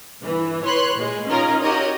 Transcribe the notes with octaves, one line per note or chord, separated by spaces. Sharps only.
G1 E3
B4 C#5 C6 F#6
A#2 G#3
C#4 D#4 F4 A#4 A#5
F#4 G4 A#4 C#5 D#5